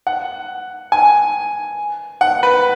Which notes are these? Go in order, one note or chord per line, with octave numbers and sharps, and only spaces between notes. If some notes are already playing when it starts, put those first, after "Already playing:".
F#5
G#5
F#5
B4